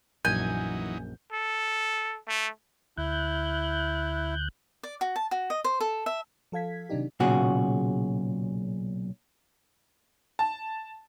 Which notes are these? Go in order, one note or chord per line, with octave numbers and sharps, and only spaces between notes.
A#1 F#2 E3 F#3 D#4 G#5 G6
A4
A3
D2 E4 F#6 G6
D5
F#4
A5
F#4
D#5
C5
A4
E5
F3 A4 F5 G#6 B6
C3 D#3 F#3 D4 D#4 G4
B1 A#2 C#3 F#4 G#4
A5